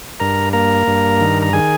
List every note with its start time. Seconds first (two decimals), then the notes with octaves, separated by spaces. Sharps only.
0.20 G2 A#4 A#5
0.53 A#3 A#4 A#5
0.87 G2
1.21 D#3
1.42 A#5
1.53 D#3 G#4 G#5